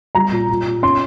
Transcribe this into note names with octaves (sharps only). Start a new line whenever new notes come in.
G3 A#5
A#2
A#2
A#2
C#4 C6